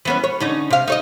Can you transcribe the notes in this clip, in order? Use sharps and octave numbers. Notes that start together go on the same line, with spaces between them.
E3 B3 C#4
C#5
D3 C#4 D#4
C3 F5
D#4 C#5 D#5